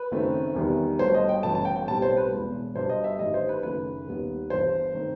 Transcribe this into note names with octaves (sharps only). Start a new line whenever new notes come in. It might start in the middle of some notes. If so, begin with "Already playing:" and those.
Already playing: B4
F#1 F#2 D#3 A3 C4
E2 D#3 G3 B3
G1 G2 F#3 A3 C5
D#5
G5
G1 F#2 E3 A3 A5
A5
G5
G5
B1 A2 G3 C4 A5
C5
B4
E1 E2 B2
G1 G2 F#3 C5
D#5
E5
A1 G2 D#3 G3 D#5
C5
B4
F#1 F#2 D#3 A3 B4
D#2 D#3 G3 B3
G1 G2 E3 C5
D#3 A3 C4